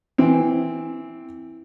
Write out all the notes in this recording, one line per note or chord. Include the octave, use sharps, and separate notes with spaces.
E3 C4